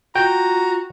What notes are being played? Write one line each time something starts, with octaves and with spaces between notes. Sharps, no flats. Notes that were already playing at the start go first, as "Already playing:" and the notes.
F4 F#4 G5 A#5